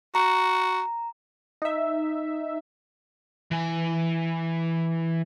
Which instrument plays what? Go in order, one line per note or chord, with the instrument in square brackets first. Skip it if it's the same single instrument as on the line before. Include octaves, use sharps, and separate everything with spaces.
[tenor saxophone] F#4 [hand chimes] A#5
[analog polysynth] D#4 E5
[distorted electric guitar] E3 G#5